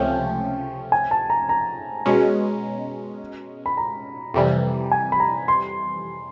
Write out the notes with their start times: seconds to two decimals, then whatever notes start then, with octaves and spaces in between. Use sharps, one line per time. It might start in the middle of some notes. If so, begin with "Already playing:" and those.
Already playing: C#2 C3 F3 A3 C#4 G5
0.92 G#5
1.11 A5
1.30 A#5
1.49 A#5
2.06 B2 G#3 C#4
3.66 B5
3.77 A#5
4.34 F2 C3 E3 G3
4.92 G#5
5.12 B5
5.20 A#5
5.48 C6